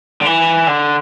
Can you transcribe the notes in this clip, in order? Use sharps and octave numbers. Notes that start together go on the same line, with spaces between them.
D3
E3
D3